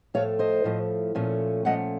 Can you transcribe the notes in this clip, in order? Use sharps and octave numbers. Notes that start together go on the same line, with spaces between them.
A2 F3 A3 C#5 F5
C5 D#5
A2 F3 A3
A#2 F3 A3 C#4
A#2 F3 A3 C#4 D#5 F#5